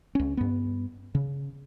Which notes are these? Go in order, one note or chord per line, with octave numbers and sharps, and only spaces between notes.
C#2 C#4
G2 B3
C#3